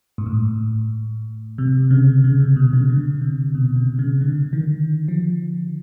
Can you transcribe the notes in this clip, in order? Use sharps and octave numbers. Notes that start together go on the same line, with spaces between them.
G#2
A2
C3
C#3
C#3
C3
B2
C#3
D3
C3
B2
C3
C#3
D3
D#3
F3